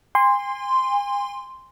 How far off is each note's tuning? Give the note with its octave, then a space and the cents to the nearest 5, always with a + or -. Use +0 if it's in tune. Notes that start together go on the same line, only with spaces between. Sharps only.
G#5 -40 C6 -5